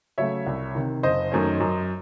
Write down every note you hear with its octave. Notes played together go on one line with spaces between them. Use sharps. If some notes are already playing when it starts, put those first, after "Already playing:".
C#3 F#3 A3 C#4 C#5 E5
C2
C3 D#3
F#1 C5 D#5
F#2 D#3 A3 C#4
F#2